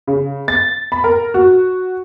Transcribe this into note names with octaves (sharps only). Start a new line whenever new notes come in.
C#3
A6
B5
A#4
F#4